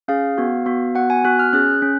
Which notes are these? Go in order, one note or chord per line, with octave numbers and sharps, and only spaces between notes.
C#4 G#4 F5
B3 F#4
B3 F#4
B3 F#4 F#5
G#5
B3 F#4 F#6
F6
C#4 G#4 F#6
C#4